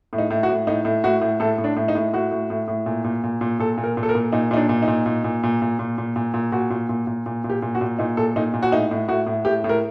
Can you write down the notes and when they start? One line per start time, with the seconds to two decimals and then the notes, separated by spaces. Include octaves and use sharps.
0.13 A2
0.18 D#4
0.30 A2
0.43 F#4
0.49 A2
0.67 A2 D#4
0.85 A2
1.04 A2 F#4
1.21 A2
1.40 A2 A4
1.58 A2
1.64 D4
1.76 A2
1.88 D#4
1.95 A2
2.13 A2 F#4
2.31 A2
2.50 A2
2.68 A2
2.86 A#2
3.04 A#2
3.24 A#2
3.41 A#2
3.59 A#2 A4
3.77 A#2
3.84 A#4
3.97 A#2
4.03 A4
4.09 A#4
4.15 A#2
4.32 A#2 D#4
4.51 A#2 D#4
4.57 D4
4.69 A#2
4.82 D#4
4.87 A#2
5.06 A#2
5.24 A#2
5.43 A#2
5.62 A#2
5.79 A#2
5.98 A#2
6.16 A#2
6.34 A#2
6.52 A#2 F#4
6.70 A#2
6.89 A#2
7.07 A#2
7.26 A#2
7.44 A#2
7.50 G4
7.62 A#2
7.75 F#4
7.81 A#2
7.99 A#2 D#4
8.17 A#2 A4
8.36 A#2 D#4
8.54 A#2
8.63 F#4
8.72 A2 D#4
8.91 A2
9.08 A2 F#4
9.26 A2
9.45 A2 G4
9.64 A2
9.69 A#4